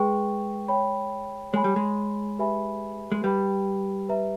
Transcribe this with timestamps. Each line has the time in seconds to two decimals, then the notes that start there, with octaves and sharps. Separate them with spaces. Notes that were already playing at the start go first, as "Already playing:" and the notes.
Already playing: G#3 G#4 B4 G5 C#6
0.68 C#5 G5 B5
1.53 G#3 C#5 G#5 B5
1.64 G3
1.76 G#3
2.39 G4 B4 E5 G#5 B5
3.12 G#3
3.23 G3 B4 G5 B5
4.09 B4 E5 A#5